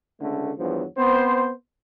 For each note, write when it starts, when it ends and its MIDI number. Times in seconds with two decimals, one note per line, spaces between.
0.21 0.51 37
0.21 0.51 50
0.21 0.51 57
0.58 0.83 40
0.58 0.83 43
0.58 0.83 53
0.58 0.83 54
0.98 1.51 59
0.98 1.51 60
0.98 1.51 72